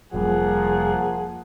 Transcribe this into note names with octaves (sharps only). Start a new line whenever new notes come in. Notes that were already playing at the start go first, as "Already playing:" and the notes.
F1 F3 G3 A#3 G#4 F#5